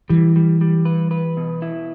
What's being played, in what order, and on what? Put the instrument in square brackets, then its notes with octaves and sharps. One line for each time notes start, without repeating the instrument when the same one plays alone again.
[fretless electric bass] E3 [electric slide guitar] G3
[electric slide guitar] G3
G3
B4
B4
B2
E4